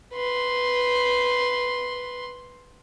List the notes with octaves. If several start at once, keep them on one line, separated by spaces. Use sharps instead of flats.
B4 C6